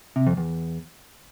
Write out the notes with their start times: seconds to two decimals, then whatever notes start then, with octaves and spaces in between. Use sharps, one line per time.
0.16 C3
0.27 F2
0.37 E2